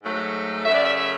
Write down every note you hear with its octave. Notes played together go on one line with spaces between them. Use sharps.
G#2 F#3 A3
F#2 C#3 F#3 A3 E5
D5
E5
E5